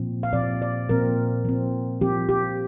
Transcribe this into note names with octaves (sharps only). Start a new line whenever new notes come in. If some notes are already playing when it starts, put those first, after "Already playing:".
Already playing: A#2 F3 C4
F5
A#2 F3 C4 D5
D5
A#2 F3 C4 A#4
F3 C4
F3 C4 G4
G4